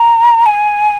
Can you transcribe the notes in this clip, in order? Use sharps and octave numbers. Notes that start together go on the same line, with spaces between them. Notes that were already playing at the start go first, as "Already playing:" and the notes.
Already playing: A#5
G#5